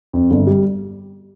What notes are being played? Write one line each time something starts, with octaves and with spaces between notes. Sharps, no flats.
F2
G1
G3